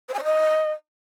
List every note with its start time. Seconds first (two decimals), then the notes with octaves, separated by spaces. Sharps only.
0.09 C5
0.14 G#5
0.19 C#5
0.24 D#5